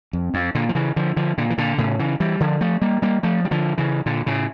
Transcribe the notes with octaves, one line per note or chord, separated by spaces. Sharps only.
F2
F2
A#2 D3
F3
C#3 E3
D3 F3
D3 F3
A#2 D3
E3
A#2 D3
A2 C#3
C#3 E3
E3 G3
D3 F3
F3 A3
G3 A#3
G3 A#3
F3 A3
G3
D3 F3
C#3 E3
A#2 D3
A2 C#3